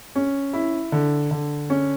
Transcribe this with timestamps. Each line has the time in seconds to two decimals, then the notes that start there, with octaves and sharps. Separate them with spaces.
0.16 C#4
0.53 E4
0.92 D3
1.31 D3
1.70 C#4